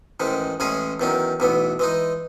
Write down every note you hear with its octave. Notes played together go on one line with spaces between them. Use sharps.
A1 G#2 D#3 G#3
A1 A2 G#3 C#4 G#4
E2 D#3 F#3 C#4
B1 A2 E3 B3
E3 G#3 D#4